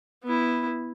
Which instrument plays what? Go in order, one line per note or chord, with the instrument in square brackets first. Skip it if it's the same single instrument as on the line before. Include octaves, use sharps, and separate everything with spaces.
[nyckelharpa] B3 E4